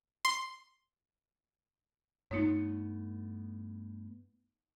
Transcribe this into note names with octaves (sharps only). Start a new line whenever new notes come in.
C6
G2 A3 B3 D#4 F4 C#5